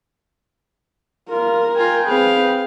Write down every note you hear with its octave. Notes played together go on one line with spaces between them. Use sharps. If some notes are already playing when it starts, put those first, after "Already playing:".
F4 A#4
F4 G5 G#5
C4 G#4 B4 F5